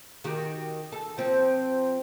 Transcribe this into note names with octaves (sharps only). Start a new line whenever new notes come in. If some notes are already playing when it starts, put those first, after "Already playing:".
D#3 F#4 G4
A4
F3 C4